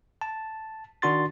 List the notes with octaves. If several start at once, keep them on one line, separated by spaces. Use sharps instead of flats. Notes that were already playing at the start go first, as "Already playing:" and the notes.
A5
D#3 D4 F#4 C6 A6